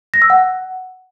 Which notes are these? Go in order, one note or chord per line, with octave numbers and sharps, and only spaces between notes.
A#6
E6
F#5